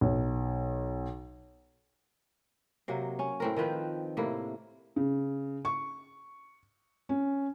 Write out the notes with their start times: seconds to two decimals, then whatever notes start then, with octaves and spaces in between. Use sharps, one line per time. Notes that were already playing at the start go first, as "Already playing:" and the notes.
0.01 B1
2.88 C3 F#3 A#3
3.19 C#4
3.40 A2 C4 A#4
3.57 D#3 F3 C4 B4
4.17 A2 C3 A#3 E4
4.96 C#3
5.65 C#6
7.09 C#4